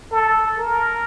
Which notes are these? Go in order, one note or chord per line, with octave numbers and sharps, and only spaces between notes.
A4
A#4